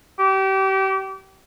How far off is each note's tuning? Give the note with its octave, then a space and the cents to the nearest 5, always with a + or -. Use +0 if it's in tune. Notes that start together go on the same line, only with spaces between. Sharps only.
G4 -30